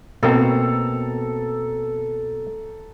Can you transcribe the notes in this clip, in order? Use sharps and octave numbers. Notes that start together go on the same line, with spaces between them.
B2 A#3 C4 A4 A#5